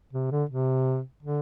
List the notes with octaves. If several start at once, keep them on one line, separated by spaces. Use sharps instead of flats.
C3
D3
C3
D3